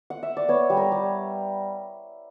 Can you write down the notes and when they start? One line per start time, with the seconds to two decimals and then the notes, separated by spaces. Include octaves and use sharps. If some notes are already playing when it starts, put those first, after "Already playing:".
0.10 F#5
0.23 E5
0.37 D5
0.49 B3 C#5
0.70 G3
0.77 A#4
0.92 G3